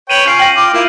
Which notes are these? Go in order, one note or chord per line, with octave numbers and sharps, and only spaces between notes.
B4 C#5 G5 D#7 F#7
C#4 F4 G6 C7 D7
G5 A#6 F#7
F4 D6
A#3 E4 F4